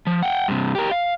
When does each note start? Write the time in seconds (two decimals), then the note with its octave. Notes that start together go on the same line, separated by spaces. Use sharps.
0.07 F3
0.23 F#5 G5
0.48 G2 C3
0.75 G4 A#4
0.91 F5